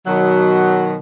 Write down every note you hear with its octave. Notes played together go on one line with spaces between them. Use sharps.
B2 D#3 F#3